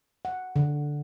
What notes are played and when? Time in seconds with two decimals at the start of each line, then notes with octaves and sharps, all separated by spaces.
0.25 F#5
0.56 D3